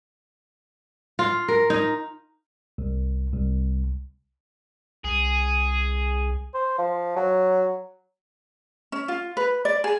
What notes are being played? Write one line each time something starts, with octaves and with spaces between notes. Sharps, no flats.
F4
A#4
D#4
C2
C2
C2 G#4
C5
F3
F#3
C#4
F4
B4
D5
G#4